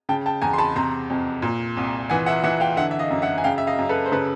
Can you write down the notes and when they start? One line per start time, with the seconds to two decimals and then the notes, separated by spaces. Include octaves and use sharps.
0.09 C#3 G5 A5
0.26 G5 A5
0.42 E2 G#5 A#5
0.53 C6
0.58 A5 B5
0.76 C3 A#5 C6
1.10 F2
1.42 A#2
1.77 C2
2.10 E3 F#5 G#5
2.26 E5 F#5
2.44 E3 E5 F#5
2.60 F5 G5
2.77 D3 E5 F#5
2.91 E5
2.99 D#5 F5
3.10 F#2
3.22 E5 F#5
3.38 G#5
3.44 C#3 F5 G5
3.58 E5
3.67 D#5 F5
3.78 F#2
3.89 A4 B4
4.06 C5
4.12 C#3 A4 B4